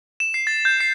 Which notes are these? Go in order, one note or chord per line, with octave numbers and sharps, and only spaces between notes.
E7
C7
A6
G6
C7